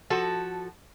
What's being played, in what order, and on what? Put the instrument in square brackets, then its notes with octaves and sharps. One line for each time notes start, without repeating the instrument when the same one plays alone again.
[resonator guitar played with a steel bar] F3 F#4 A4